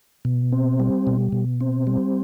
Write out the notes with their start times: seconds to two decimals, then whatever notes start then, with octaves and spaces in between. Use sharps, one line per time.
0.25 B2
0.52 C4
0.80 G3
1.07 B2
1.32 B2
1.61 C4
1.87 G3